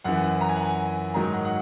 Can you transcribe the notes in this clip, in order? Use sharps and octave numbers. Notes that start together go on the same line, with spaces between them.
F#2 E3 F#5
F#5
A#5
G#5
F#5
G#5
G#2 D#3 F#3 A#5
F#5
F#5